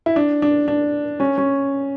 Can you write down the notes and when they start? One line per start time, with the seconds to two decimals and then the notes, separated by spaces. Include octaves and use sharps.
0.06 E4
0.16 D4
0.42 D4
0.68 D4
1.20 C#4
1.38 C#4